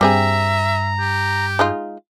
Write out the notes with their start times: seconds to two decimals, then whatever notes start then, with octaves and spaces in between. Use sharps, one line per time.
0.01 G2 G3 C4 G#4 E5 A#5
0.99 G4
1.59 G#3 D#4 F4